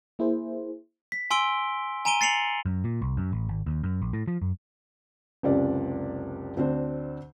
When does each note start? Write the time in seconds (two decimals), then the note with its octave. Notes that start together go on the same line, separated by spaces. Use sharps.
0.19 A#3 E4 G#4 C5
1.12 B6
1.31 G#5 C6 E6 D7 G7
2.05 G#5 A#5 D7 D#7 G7
2.21 A6 C7 C#7 F7 F#7
2.66 F#2
2.84 A#2
3.02 C2
3.17 F#2
3.32 A1
3.49 G#1
3.66 D#2
3.83 F#2
4.02 A#1
4.13 A2
4.28 F3
4.42 F#2
5.43 F#1 C#2 C3 D5
6.57 D2 C4 D4 C5